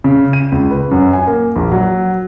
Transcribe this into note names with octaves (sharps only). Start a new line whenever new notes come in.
C#3
D#7
C#2
B4
F#2
G#5
A#3
A#1
F#3